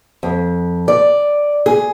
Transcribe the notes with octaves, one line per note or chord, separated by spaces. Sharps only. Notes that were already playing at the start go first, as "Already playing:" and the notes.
F2
D5
G#4